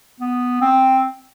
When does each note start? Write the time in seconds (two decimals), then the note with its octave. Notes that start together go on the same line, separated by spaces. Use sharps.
0.20 B3
0.61 C4